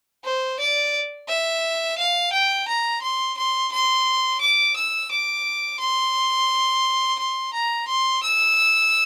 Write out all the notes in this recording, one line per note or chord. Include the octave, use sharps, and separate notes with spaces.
C5
D5
E5
F5
G5
A#5
C6
C6
C6
D6
E6
D6
C6
C6
A#5
C6
E6